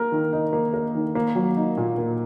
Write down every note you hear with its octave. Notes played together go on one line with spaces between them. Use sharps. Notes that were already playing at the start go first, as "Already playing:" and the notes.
Already playing: A#3 A#4
D#3
D#4
A#3
A#4
D#3
A#3
F#3
D#4
A#2
A#3